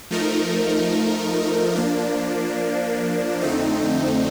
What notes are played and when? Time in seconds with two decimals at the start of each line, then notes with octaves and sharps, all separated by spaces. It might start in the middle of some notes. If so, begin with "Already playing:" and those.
0.11 F3 A3 D#4 A#4
1.76 F3 A#3 D4
3.41 F2 D3 A3 C4 D#4